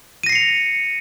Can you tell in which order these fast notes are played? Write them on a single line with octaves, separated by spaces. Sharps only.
D#7 A#6 C7 C#7 F7